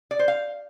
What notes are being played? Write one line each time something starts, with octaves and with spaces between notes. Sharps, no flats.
D5
C5
F5